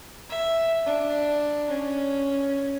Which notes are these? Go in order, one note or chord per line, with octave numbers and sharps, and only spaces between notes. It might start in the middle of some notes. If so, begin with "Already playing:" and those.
E5
D4
C#4